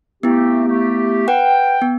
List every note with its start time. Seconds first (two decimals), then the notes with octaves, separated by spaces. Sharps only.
0.23 A3 B3 C4 E4 G4
0.67 A3 G4
1.28 B4 F#5 G5
1.82 B3